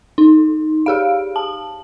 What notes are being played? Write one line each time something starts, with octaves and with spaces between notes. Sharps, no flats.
D#4
G4 G#4 F5
A5